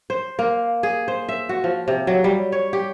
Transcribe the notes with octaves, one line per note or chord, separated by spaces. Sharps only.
C5
A#3
G#4
C5
E5
F#4
F3
C3
F#3
G3
C#5
G4